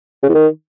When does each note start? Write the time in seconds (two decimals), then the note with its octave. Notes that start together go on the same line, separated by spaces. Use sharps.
0.23 C#3
0.29 E2
0.34 D#3